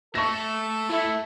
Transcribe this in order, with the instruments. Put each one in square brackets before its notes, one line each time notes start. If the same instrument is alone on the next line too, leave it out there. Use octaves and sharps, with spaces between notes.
[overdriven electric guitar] A3 [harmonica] A4 [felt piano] C#6 A#6
[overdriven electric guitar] A3 [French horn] E4